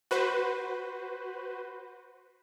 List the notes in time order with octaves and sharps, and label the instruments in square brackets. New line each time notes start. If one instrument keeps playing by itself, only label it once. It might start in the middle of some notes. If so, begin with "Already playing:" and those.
[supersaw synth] F#4 B4 C5